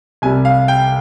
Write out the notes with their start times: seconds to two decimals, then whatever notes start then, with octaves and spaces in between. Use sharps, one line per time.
0.22 C2 C3 G3 G#5
0.45 F5
0.68 G5